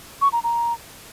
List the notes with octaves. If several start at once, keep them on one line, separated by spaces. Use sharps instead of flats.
C#6
A#5
A#5